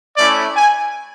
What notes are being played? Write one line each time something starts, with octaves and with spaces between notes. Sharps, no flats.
A3 C#4 E4 D5
G#5